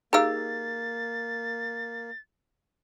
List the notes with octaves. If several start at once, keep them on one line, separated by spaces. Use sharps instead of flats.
A#3 D#4 G4 G#4 F5 E6 A6